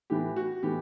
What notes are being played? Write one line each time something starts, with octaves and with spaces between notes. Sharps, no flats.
A2 E3 B3 G4
F#4
A2 E3 B3 G4